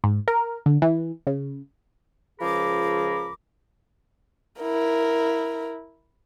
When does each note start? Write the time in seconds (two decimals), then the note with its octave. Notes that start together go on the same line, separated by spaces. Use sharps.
0.04 G#2
0.28 A#4
0.66 D3
0.82 E3
1.27 C#3
2.40 C#2 F3 G#4 A#4 B5 D6
4.61 E4 A#4